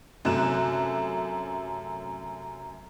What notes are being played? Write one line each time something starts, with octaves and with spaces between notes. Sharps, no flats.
F#2 C3 A3 F#6 E7